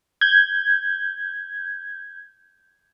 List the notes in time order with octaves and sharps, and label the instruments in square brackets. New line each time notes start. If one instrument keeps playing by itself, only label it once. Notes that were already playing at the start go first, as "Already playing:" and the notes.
[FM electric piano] G6 G#6